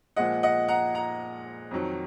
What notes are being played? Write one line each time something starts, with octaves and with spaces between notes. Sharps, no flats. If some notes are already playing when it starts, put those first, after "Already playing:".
A#2 F3 G#3 D#5 F#5
D#5 F#5
F#5 A#5
F#5 A#5
F2 D#3 F#3